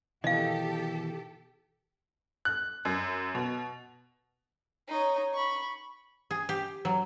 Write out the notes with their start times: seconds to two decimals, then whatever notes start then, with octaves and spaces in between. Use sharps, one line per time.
0.24 B2 D#3 E3 G4 A4 D#5 F5
2.45 F#6
2.85 F#2
3.35 B2
4.88 D#4 C#5
5.33 B5 C#6
6.31 G#4
6.49 G4
6.85 F#3